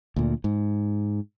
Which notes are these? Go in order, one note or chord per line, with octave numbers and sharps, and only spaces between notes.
D2 A#2
G#2